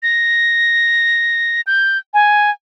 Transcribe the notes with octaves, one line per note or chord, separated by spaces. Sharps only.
A#6
G6
G#5